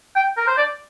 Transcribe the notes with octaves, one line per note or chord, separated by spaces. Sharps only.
G5
A#4
C5
D5